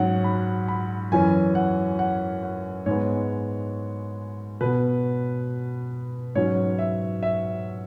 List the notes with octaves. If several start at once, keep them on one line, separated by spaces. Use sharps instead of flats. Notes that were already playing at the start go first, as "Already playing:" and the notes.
Already playing: G#2 F#3 C#4 F#5
B5
B5
F#2 E3 C#4 G#5
F#5
F#5
F#5
G#2 G#3 B3 C#5
B2 B3 B4
G#2 F#3 C#4 C#5
E5
E5